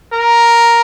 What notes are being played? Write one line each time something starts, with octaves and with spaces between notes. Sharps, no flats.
A#4